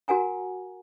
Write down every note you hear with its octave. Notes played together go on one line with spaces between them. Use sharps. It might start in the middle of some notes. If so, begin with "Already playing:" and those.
F#4 A#4 F#5 G#5 A#5